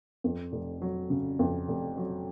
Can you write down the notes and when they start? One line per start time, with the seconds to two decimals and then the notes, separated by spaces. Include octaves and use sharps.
0.24 F2
0.52 F1
0.82 F#3
1.10 C#3
1.39 F2
1.68 F1
1.97 F#3